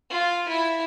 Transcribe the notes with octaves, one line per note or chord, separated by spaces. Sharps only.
F4
E4